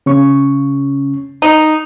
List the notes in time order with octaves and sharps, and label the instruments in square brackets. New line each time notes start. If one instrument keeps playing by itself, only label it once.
[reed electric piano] C#3 C#4 C#6
[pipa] D#4